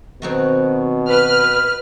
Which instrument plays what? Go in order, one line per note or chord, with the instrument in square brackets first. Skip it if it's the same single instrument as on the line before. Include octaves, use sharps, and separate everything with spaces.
[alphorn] B2 [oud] D#3 F#3 C4
[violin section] B4 F6